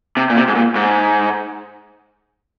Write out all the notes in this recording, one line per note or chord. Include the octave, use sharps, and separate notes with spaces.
C3
A#2
C3
G#2
A#2
G#2